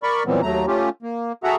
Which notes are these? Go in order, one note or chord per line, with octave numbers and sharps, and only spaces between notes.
A#4 D5 B5 C#6
A#2 E3 F#3 G3 B3 C4
D#2 F#3 A3 A#5
A3 C#4 F4 G4
A#3
F#4 G#4 A4 E5 F#5 A#5